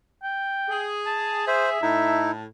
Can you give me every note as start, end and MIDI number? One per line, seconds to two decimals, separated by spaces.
0.23 0.90 79
0.70 1.78 68
1.06 1.43 81
1.47 1.70 72
1.47 2.20 76
1.82 2.45 45
1.82 2.31 63
1.82 2.31 64
1.82 2.45 81